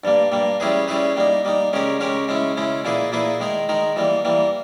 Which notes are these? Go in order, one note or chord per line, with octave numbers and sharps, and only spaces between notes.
G2 G3 A#3
G2 G3 A#3
G3 C#4 E4 G#4 B4
G3 C#4 E4 G#4 B4
G3 A#3 D#4
G3 A#3 D#4
C#3 G#3 C#4 G4 A#4
C#3 G#3 C#4 G4 A#4
C#3 G#3 C#4 E4
C#3 G#3 C#4 E4
A#2 A#3 E4 G#4 B4
A#2 A#3 E4 G#4 B4
D#3 G#3 D#4 A#4
D#3 G#3 D#4 A#4
E3 G3 A#3
E3 G3 A#3